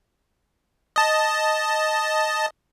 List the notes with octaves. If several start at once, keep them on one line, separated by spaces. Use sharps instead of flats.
D#5 A5